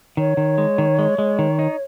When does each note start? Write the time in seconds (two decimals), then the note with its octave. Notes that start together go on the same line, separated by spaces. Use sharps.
0.17 D#3 C#5
0.37 D#3
0.58 G#3
0.78 D#3
0.99 G#3
1.18 G#3
1.39 D#3
1.59 D#4